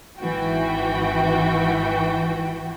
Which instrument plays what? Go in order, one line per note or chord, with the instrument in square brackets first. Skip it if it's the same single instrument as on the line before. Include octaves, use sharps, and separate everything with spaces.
[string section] G#1 E3 F#4 G5